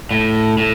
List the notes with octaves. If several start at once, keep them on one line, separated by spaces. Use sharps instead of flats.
A2
A2